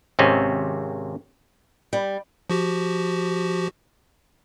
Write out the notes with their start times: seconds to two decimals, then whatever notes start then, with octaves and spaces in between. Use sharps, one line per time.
0.19 G#1 C3 C4 C#4 D#5
1.93 G3
2.50 F3 F#4 G4